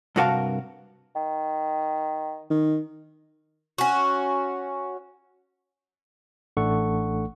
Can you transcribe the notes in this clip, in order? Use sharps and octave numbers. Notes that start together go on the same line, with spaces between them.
G2 C3 F#4 A#4 F5 A5
D#3
D#3
C#4 F#4
A1 A3 D4 A4 F#5 C#6